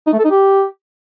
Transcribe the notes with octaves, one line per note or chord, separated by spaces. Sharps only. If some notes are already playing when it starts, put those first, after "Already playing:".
D#4
A3
A4
D#4
G4